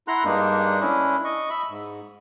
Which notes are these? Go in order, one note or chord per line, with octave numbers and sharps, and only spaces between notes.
E4 F#5 A#5 C6 F#6
G2 G#3 A#3 D4 D#4
C#4 D4 E4
D#5 C#6
E5 B5
G#2